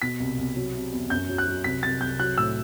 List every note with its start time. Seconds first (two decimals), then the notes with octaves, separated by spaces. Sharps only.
0.02 B2 B6
0.20 C2
0.38 C2
0.56 F#3
0.75 C3
0.92 E2
1.10 F#2 G6
1.29 F#3
1.38 F#6
1.47 F#3
1.64 C2 B6
1.83 C2 A6
2.01 C2 G6
2.19 F#3 F#6
2.38 A2 E6